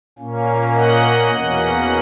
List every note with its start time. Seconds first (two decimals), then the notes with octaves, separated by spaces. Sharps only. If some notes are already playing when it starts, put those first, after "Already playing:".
0.19 A#2 A#3 C#4
0.74 D#5 F#5
1.30 E2 B2 A#3 C#4